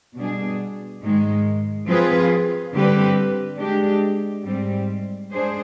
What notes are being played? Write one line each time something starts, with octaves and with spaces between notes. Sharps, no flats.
B2 G3 D4 G#4
G#2 D#3 G#3
F3 C4 F4 G#4 B4
D3 G3 C4 G4 B4
G#3 D4 G4
G#2 G3 C4
G#3 D4 G#4 C5